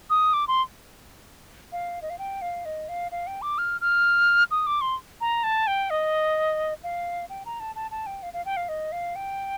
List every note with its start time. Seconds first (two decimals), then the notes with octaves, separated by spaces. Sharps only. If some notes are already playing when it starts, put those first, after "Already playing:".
0.10 D#6
0.33 D6
0.48 C6
1.72 F5
2.02 D#5
2.10 F5
2.18 G5
2.41 F5
2.65 D#5
2.88 F5
3.11 F5
3.27 G5
3.42 D6
3.58 F6
3.81 F6
4.51 D#6
4.66 D6
4.81 C6
5.21 A#5
5.43 A5
5.67 G5
5.90 D#5
6.83 F5
7.29 G5
7.45 A#5
7.60 A5
7.75 A5
7.91 A5
8.06 G5
8.22 F5
8.33 F5
8.45 G5
8.57 F5
8.68 D#5
8.92 F5
9.15 G5